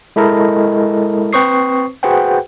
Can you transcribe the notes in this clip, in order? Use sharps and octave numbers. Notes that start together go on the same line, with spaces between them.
G#3 E4 A4 A#4 D#5
C4 B4 C5 C#6 D#6 C7
F#4 G#4 B4 C5 F#5 G5